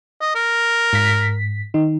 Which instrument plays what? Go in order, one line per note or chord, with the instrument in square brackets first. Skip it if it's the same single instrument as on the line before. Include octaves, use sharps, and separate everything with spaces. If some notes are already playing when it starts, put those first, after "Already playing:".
[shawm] D#5
A#4
[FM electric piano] G#2 B6
D#3 D#4